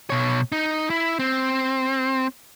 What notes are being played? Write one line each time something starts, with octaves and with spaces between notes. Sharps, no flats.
B2 C#5
D#4
E4
C4